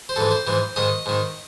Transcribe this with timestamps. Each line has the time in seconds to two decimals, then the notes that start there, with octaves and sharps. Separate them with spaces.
0.09 C5
0.16 G#2 E3 A4
0.31 C5
0.47 G#2 E3
0.76 G#2 D#3 D#5
1.06 G#2 D#3